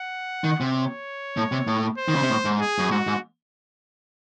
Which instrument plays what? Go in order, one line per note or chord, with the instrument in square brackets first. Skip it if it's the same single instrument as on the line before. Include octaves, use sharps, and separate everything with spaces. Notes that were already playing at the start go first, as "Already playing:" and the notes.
Already playing: [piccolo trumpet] F#5
[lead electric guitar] D#3
C3
[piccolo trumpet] C#5
[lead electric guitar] A2
C3
A2
[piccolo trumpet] C5
[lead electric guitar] D#3
C#3
C3
A2
G#2
[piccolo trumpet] G#4
[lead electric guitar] F#2
[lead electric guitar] G#2 [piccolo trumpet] F#4
[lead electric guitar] G#2